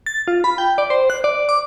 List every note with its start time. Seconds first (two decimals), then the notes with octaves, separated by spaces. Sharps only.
0.06 A6
0.28 F4
0.44 B5
0.58 G5
0.78 D5
0.90 C5
1.10 F#6
1.24 D5
1.49 D6